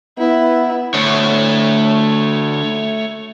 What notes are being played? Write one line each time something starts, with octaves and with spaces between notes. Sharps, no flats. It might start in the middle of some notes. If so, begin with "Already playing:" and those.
B3 E4
D2 A3 C#5